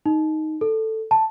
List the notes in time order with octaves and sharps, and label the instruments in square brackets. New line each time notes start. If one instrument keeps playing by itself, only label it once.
[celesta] D#4
A4
A5